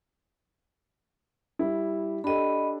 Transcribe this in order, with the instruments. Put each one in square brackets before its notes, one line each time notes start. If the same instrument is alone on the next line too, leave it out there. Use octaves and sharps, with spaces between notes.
[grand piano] G3 E4
[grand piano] D4 G4 A4 [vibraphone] D#5 B5